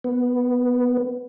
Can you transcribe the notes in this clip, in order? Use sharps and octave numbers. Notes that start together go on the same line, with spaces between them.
B3